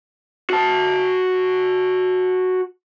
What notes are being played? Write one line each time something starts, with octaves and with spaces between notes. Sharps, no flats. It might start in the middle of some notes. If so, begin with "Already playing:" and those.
F#4 A5